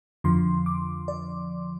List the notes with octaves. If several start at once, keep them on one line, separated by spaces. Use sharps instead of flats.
F2 D3 F3 C6
D6
D5